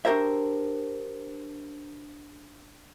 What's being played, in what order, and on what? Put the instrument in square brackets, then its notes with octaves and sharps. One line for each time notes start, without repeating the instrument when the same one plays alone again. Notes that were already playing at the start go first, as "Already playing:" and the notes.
[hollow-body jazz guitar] D4 F#4 G4 A#4 C5 E5